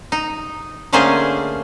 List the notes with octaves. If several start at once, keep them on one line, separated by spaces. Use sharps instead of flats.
D#4
D3 A3 A#3 C#4 G#4 C5